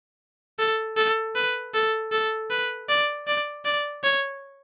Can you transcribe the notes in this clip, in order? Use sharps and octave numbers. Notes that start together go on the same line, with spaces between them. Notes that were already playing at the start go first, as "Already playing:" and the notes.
A4
A4
B4
A4
A4
B4
D5
D5
D5
C#5